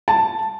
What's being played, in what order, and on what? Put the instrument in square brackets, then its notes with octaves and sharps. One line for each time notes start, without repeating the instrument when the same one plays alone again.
[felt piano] A5